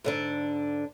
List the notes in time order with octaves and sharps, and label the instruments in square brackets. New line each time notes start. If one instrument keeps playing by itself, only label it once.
[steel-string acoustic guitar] G#2 D3 D4